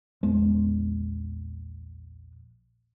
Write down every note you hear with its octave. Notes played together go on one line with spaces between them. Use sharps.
A#1 E2 G#3 B3